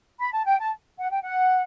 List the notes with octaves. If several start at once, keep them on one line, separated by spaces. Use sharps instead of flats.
B5
A5
G5
A5
F#5
G5
F#5